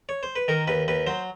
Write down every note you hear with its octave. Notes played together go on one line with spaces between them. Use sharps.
C#5
C5
B4
D#3 A#4
D#2 B4
D#2 B4
F#3 C5